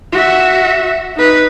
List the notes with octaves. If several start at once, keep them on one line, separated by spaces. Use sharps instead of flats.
F#4 E5
D#4 B4